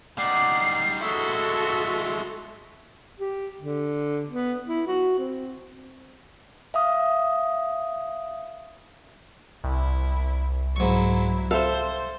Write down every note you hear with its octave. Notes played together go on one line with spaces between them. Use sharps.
G3 D#4 D5 F#5 C7
G#3 E4 F#4 A4 C6 C#6 E6
G4
D3
B3
E4
F#4
C4
E5 F5 D#6
C2 E4
G#2 F#3 E4 C#6
A4 C5 E5 F5